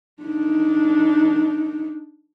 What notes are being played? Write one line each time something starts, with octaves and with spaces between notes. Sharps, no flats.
D4 D#4